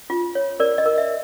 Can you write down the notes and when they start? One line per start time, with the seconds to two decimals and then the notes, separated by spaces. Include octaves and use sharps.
0.10 F4
0.35 C#5
0.60 A#4 D5
0.78 D#5
0.86 A#4
0.98 E5